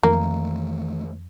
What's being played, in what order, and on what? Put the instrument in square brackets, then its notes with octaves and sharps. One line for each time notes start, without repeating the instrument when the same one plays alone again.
[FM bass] F2 [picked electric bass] D#3 E3 A3 [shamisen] A#3